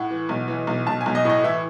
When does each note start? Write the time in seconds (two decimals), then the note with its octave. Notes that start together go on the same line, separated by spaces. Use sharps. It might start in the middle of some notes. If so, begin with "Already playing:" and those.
Already playing: A2 F#5
0.11 E3
0.29 B1
0.48 E3
0.67 B1
0.87 B1 A5
1.01 G#5
1.06 B1
1.15 D#5
1.25 A2 D#5
1.44 E3 E5